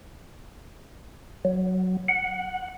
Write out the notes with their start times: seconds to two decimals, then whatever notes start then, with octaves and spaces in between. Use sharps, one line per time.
1.45 F#3
2.08 F#5